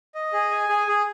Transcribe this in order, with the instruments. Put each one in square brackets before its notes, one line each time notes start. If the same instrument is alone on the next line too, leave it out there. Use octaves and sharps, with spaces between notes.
[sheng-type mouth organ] D#5
G#4
G#5
G#4
G#4